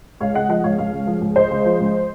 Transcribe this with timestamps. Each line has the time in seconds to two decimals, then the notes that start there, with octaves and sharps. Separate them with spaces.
0.20 C#2 C#5 F5
0.34 C#3 D#5 F#5
0.49 F3 D#5 F#5
0.64 C#2 C#5 F5
0.78 C#2 C#5 F5
0.92 C#3
1.07 F3
1.21 C#2
1.36 C#2 C5 D#5
1.51 C#3
1.65 F3
1.80 C#2